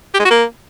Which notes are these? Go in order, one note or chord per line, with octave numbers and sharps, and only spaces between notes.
G4
G#3
F#4
A#3